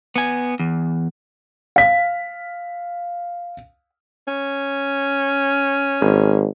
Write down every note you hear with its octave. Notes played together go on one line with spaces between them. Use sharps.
B3 G#5
E2
F5 B6
C#4
G#1